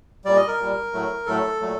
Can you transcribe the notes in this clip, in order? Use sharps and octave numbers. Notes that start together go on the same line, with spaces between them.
A#2 G3 D5
D#5
A#4
A#2 G3
A2 F#3 A3
A2 F#3 A3 A4
A#2 F#3 A3